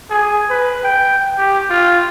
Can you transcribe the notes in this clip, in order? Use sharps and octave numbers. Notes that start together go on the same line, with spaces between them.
G#4
B4
G5
G4
F4